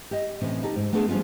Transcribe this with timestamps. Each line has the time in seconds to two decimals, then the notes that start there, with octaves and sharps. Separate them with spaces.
0.11 G4 D#5
0.41 A2 C3 E3 C#4
0.63 D#4 G4 A4
0.76 G#2
0.93 A3 B3 D4 G#4 A4
1.08 F3 G3 C#4 D4 F4